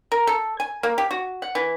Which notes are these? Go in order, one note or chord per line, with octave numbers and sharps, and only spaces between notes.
A#4
A4
G#5
A#3
G4
F#4
F#5
E3